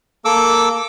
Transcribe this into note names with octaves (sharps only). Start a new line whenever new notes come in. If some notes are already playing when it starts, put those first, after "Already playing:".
A#3 A4 D6 E6